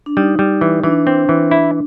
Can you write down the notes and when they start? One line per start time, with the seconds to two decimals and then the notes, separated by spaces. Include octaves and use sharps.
0.06 D4
0.17 G3 D#4
0.39 G3
0.61 E3
0.84 E3 D4
1.07 C4
1.29 E3
1.51 E4